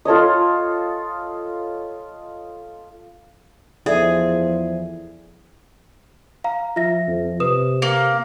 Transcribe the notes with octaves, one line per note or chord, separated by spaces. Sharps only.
F4 A4 C#5 D#5
E2 F3 G#4 A4 D5 E5
F5 A#5
F3 F4 E5 A#6
F2
C3 B4 D#6 E7
A#3